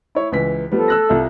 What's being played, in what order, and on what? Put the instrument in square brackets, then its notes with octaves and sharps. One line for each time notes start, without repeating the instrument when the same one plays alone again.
[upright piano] E4 C#5
C#2 E3 B6
[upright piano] F3 G3 B3 [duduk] A4
[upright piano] E6 F#6 A#6
C2 F4 E5